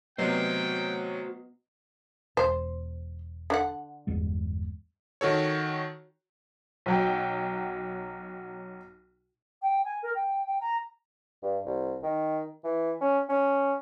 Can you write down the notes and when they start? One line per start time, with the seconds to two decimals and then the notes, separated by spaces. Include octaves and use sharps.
0.18 C3 F#3 B3 F#4 C5 D#5 G5
2.37 E1 C5
3.50 D3 F#5
4.07 G1 E2 G#3
5.21 D#3 F#4 A4 C#5
6.86 B1 F#3 G5
9.62 G5
9.85 G#5
10.03 A#4
10.15 G5
10.46 G5
10.61 A#5
11.43 G2
11.66 C2
12.03 D#3
12.64 E3
13.01 C#4
13.29 C#4